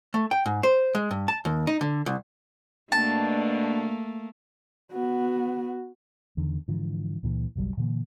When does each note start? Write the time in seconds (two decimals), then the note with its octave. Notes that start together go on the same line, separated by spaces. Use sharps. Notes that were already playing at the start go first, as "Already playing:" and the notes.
0.14 A3
0.31 G5
0.46 G#2
0.63 C5
0.95 G#3
1.11 G2
1.28 A5
1.45 D#2
1.67 D#4
1.81 D3
2.06 C2
2.92 B2 A3 A#3 D4 A5
4.93 B3 F#4
6.37 E2 D3 D#3
6.68 G#2 D3 E3 F3
7.23 C#2 A#2 E3
7.56 F#1 B1 F#3 G3
7.77 A#2 D3 E3 A#3